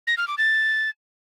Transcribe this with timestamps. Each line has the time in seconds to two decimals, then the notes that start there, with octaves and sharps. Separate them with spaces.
0.07 A#6
0.17 F6
0.28 D6
0.38 A6